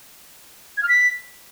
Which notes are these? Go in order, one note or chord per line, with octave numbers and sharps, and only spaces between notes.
G#6
F6
B6